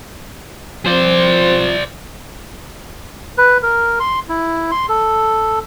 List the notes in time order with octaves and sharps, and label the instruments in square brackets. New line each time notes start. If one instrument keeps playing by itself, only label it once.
[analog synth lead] F3 [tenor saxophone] C4 [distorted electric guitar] C5 D5
[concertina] B4
A#4
C6
E4
C6
A4